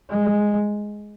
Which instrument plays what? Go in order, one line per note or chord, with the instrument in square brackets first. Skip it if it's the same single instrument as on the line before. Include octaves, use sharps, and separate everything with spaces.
[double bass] G#3